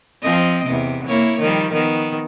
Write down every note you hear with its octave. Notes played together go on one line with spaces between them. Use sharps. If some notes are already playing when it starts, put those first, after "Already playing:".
F3 C4 D#5
E2 C3
A#3 E4 C#5
D#3 F3 G3
D#3 B3